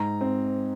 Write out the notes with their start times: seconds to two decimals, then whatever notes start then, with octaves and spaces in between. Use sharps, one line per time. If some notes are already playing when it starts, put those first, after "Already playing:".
Already playing: G#2 A#5
0.21 C4